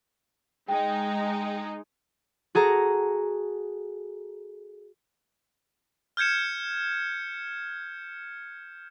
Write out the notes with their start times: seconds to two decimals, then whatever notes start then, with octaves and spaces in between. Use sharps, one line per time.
0.68 G#3 D#4 G5
2.55 F#4 G#4 A4 A#5
6.17 F6 G6 G#6 C#7 E7